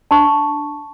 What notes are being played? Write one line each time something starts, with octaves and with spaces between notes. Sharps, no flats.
D4 A5 C#6